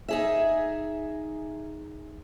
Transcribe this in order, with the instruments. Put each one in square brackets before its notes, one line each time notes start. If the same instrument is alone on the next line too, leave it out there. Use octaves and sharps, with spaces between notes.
[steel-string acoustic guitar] D#4 G#4 E5